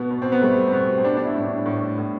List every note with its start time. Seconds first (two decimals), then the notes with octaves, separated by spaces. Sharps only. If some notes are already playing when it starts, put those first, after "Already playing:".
Already playing: B2 B3
0.11 B2
0.22 C4
0.32 B3
0.42 G3 A3
0.67 C4
0.73 B2 B3
0.98 C4
1.04 G3 D4
1.17 D4
1.25 E4
1.35 A2
1.46 D4
1.66 A2
1.98 A2